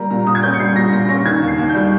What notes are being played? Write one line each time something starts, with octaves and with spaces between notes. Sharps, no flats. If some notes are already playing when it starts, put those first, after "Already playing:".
Already playing: G3 A#3 A#5
A#2 A#5
A#2 D#6
G#6
C#4 G6
C#7
G3 C7
A#2 A#6
A#2 A#6
C#4 A#6
D#3 G#6
D#2
C7
D#2
G6
G3